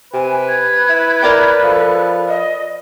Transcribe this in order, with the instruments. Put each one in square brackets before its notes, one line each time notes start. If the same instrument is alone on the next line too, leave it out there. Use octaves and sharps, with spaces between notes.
[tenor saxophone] C3 [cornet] B4 [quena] G#5
[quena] G#6
[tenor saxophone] E4
[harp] A#4 D5 G5
[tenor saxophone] F3 [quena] A4
[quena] D#5